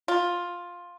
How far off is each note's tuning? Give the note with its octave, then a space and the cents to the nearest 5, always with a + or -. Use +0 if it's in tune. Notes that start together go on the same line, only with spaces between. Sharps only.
F4 +10